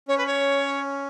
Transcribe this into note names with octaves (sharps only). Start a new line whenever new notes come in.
C#4 C#5
B4
C#5